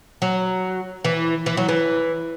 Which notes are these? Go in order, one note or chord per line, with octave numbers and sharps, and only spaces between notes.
F#3
E3
E3
F#3
E3